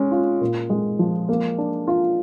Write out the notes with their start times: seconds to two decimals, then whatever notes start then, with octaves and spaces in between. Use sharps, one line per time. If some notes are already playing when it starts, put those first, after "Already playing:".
Already playing: G#3 C#4
0.11 F4
0.41 A#2
0.70 G#3
0.99 F3
1.29 A#3
1.58 D4
1.87 F4